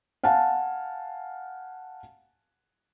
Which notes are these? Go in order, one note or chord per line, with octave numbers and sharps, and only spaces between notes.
F5 F#5 G#5 A5